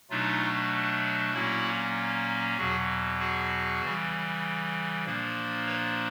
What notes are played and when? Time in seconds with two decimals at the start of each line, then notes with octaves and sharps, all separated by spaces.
0.10 B2 F#3 A3 D4 D#4 F4
1.33 A#2 F#3 A#3 C#4 E4 F#4
2.57 E2 B2 F#3 F#4 G#4
3.19 F#4 G#4
3.81 C#3 E3 G3
5.05 A#2 F3 A#3 D4
5.66 B4 C#5